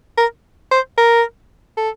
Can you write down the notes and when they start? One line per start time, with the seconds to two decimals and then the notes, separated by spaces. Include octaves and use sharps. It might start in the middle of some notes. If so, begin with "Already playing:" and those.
0.18 A#4
0.71 C5
0.98 A#4
1.77 A4